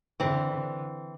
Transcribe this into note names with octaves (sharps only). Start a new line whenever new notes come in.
D3 E3 C4